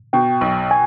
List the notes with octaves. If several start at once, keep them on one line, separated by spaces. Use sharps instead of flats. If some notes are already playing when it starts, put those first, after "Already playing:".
B2 G5
B1
G#5